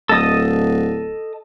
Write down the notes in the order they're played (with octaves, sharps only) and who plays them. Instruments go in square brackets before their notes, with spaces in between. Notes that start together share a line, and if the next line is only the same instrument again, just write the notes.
[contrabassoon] D1 [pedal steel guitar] A4 D#5 D#6